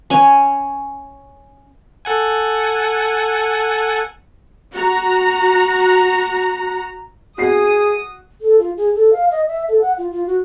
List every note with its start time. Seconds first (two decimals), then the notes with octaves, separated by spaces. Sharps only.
0.10 C#4 G#5
2.05 A4 F#5 G#5
4.73 F#4 A#5
7.38 F#4 G#4 D#6 C7
8.41 A4
8.59 F4
8.77 G#4
8.95 A4
9.13 F5
9.31 D#5
9.48 E5
9.69 A4
9.81 F#5
9.98 F4
10.11 F4
10.27 F#4